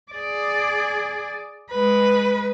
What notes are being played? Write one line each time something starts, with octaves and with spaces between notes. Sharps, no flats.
G#4 D5
G#3 B4